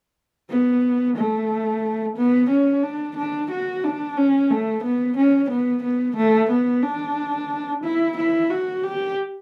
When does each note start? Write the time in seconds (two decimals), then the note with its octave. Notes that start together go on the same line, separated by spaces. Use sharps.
0.49 B3
1.16 A3
2.16 B3
2.50 C#4
2.83 D4
3.16 D4
3.51 F#4
3.84 D4
4.17 C#4
4.50 A3
4.83 B3
5.16 C#4
5.50 B3
5.83 B3
6.17 A3
6.50 B3
6.83 D4
7.84 E4
8.17 E4
8.50 F#4
8.83 G4